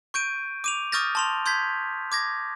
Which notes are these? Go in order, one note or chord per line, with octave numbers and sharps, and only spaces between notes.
C#6 G6 D7 D#7
D6 D#7 F7
C#6 D#6 F6 G6 A6 A#6
A5 C6 F7
C6 G6 G#6 B6
D6 G#6 A#6